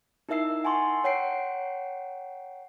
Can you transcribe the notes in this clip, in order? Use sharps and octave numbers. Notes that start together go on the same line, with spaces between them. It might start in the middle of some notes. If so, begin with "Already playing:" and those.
D#4 E4 A#4 E5 E6 C7
F#5 G#5 A5 C6 C#6
C#5 F#5 G5 A#5 C7 D7